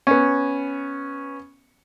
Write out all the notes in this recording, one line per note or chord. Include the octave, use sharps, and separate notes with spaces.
B3 C#4